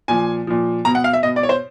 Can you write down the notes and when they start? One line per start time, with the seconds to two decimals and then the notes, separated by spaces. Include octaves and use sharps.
0.08 A#2 F3 G#5
0.47 A#2 F3
0.85 B2 A#5
0.95 F#5
1.04 F5
1.13 E5
1.23 B2 D#5
1.36 D5
1.43 C#5
1.49 C5